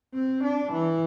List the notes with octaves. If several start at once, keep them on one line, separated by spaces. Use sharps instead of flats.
C4
D4
E3